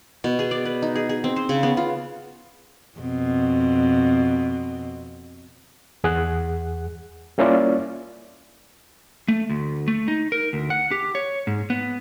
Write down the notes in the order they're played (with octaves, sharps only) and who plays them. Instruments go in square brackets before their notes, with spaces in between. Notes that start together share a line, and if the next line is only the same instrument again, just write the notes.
[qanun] B2
G#4
D5
B4
D#4
G#4
G#4
C4
C5
C#3
B3
F4
[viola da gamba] F2 B2 C4
[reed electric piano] E2 G#4 F#5 F#6
G3 A#3 C#4 E4 F4 D5
[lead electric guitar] A3
D2
A3
D#4
A#4
D2
F#5
G4
C#5
G#2
B3